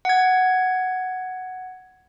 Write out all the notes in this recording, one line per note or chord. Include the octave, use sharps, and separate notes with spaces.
F#5 G#6